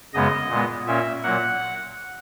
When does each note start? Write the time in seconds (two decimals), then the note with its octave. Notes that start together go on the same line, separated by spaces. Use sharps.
0.14 F#2 C#3 G#3 B3 D#5
0.50 A#2 G#3 B3
0.86 A#2 A#3 C#4 E5
1.23 A#2 F#3 A#3 F#5